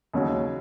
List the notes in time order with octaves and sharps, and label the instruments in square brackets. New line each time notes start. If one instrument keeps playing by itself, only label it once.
[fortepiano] D#2 C#3 F#3 C#4